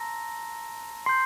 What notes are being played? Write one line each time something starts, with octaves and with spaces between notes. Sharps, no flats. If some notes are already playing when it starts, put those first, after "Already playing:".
Already playing: A5 A#5 C6 E6 A#6
C6 G6 C7